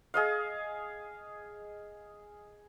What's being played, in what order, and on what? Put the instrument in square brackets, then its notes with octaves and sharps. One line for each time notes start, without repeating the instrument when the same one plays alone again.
[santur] G#4 D#5 F5